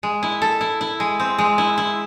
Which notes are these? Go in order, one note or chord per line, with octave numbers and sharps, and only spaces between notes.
G#3
E4
A4
E4
E4
G#3
C4
G#3
E4
E4